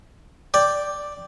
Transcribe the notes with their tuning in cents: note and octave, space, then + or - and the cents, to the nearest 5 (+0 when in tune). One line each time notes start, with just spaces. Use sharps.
D5 +0 G5 +0